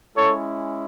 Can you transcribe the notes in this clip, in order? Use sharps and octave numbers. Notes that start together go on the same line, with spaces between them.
G#3 C#4 E4 A4 C#5